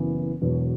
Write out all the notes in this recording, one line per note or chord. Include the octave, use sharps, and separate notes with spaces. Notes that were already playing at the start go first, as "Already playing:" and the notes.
Already playing: F#1 F#2 E3 B3
E1 E2 B2 F#3